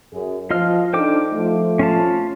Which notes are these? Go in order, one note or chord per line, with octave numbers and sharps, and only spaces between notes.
F#2 G#4
F3 F4 D#5 F6
D4 D#4 A4 C5 G5 D6
F3 A3
C#4 F4 A5